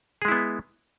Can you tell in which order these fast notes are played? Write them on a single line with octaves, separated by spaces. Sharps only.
G#4 G#3 E4 B3